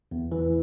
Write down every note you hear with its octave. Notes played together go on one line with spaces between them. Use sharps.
E2
E3